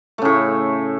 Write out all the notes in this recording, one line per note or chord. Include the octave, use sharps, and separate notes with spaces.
A2 C#3 A3